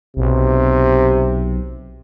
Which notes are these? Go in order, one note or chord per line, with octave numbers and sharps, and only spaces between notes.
B1 C3